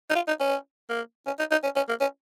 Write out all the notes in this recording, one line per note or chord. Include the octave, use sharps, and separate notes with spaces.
D#4
F4
D#4
C#4
A#3
C#4
D#4
D#4
C#4
C#4
A#3
C#4